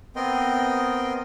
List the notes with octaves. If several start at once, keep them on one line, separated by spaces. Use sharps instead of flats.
B3 C4 A#4 D#5 G5 C6